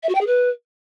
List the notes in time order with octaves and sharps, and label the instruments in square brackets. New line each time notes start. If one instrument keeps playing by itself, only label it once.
[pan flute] E5
F#4
G5
G#4
B4